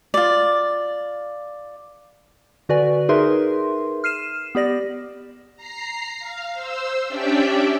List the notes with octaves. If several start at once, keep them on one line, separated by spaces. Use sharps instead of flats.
F4 D5
D3 F#4 B4 D5 G#5
D#4 G#4 A#4 B4 E5 C6
F6 C7 D#7 E7
B3 G4 D5 A#6
A#5 C7
F5
C5 E6
C#4 D4 G4 D5 E5 G5